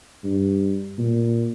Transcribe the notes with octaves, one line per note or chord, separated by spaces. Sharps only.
G2
A#2